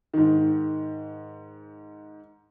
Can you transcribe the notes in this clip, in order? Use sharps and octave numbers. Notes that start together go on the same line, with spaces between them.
G#2 D#3